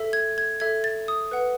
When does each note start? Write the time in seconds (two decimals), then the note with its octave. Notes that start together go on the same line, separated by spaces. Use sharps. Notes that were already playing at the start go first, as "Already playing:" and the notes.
Already playing: A4 E5
0.13 G#6
0.38 G#6
0.60 A4 E5 G#6
0.84 A6
1.08 D#6
1.31 B4 F#5